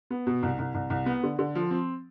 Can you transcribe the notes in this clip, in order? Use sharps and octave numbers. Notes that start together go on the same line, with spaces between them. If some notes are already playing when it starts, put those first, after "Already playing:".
B3
B2
C2
C2
C2
C2
B3
D3
D3
F3
C4